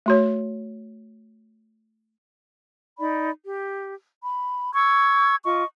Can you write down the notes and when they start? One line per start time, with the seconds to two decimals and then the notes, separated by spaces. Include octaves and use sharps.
0.06 A3 F#4 C#5
2.99 D#4 D5 B5
3.45 G4
4.23 B5
4.75 C#6 E6 G#6
5.45 F4 D#5 C#6